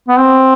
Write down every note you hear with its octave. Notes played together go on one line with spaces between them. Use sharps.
B3
C4